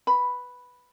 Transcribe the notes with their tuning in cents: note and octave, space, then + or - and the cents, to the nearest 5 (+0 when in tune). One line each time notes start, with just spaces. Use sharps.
B4 +0 B5 +0